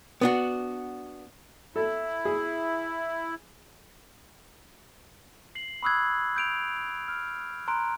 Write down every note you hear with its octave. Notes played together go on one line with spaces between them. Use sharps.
B3 D4 F#4
E4 A4
G#4
C7 F#7
B5 C#6 D#6 E6 F#6 G#6
G6 D7 F7
F6
A#5 C6 F#6 D7